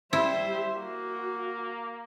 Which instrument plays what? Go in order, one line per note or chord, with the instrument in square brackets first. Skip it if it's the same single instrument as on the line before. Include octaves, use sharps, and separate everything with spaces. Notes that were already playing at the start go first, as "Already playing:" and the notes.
[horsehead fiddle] G3 E5 [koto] E4 [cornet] C5
[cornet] A#3 [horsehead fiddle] F#4